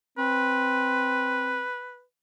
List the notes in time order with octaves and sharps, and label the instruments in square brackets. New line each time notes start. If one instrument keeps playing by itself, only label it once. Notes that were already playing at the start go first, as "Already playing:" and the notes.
[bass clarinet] C4 [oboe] B4